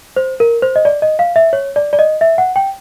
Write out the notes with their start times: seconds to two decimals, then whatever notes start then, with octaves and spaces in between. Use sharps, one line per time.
0.16 C5
0.40 A#4
0.62 C5
0.76 D#5
0.85 D5
1.02 D#5
1.19 F5
1.36 E5
1.53 C#5
1.76 D5
1.93 D5
1.99 D#5
2.21 E5
2.38 F#5
2.56 G5